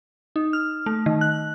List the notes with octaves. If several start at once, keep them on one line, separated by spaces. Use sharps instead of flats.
D#4
F6
A3
D#3
F#6